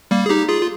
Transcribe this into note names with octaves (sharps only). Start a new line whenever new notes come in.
G3 A#3
G#4
D#4 G4
F4 G#4
F4